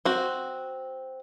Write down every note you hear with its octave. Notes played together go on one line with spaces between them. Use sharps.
C4 F#4